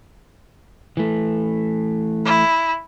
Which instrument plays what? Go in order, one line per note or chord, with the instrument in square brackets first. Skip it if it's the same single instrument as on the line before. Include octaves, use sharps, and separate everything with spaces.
[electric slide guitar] E3 A3
[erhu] E4